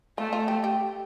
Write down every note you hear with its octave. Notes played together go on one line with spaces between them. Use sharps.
A3 F4
F4
G4
G4